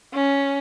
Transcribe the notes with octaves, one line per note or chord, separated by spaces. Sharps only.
C#4